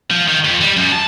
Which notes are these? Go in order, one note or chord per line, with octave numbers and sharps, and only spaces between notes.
F3
D#3
F2
G3
F#2
A5